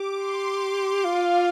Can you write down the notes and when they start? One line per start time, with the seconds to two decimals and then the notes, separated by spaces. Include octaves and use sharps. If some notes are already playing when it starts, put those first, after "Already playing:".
Already playing: G4 D6
0.15 C6
0.45 D6
1.05 F4 F5